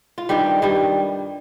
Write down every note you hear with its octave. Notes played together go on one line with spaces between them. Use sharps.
F4
G2 D#3 G3 G4
G2 D#3 G3